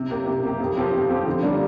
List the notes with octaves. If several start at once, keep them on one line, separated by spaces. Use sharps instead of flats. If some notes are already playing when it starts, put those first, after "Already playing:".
Already playing: C3
A#3 G4
C3
A#3 G4
F2
F3 C4 G4
F2
F3 C4 G4
D3
G3 A#3 D4 F4